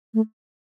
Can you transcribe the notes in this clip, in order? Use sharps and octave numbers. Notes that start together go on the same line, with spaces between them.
A3